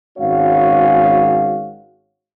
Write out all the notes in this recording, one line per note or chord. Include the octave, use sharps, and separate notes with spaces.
G#1 G#3 C#4 F#4 C#5 F5